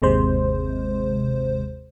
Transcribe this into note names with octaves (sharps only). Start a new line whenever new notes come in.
G1 D#2 C3 G#3 C5